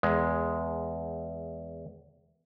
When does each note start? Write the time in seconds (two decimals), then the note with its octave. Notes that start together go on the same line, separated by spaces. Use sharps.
0.03 E2 G#3